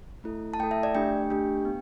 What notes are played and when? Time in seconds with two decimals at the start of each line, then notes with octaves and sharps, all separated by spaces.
0.24 A3 E4 A4
0.54 A5
0.59 A3 E4 A4 G5
0.71 E5
0.83 D5
0.95 A3 D4 G4 G5
1.30 A3 D4 G4
1.65 B3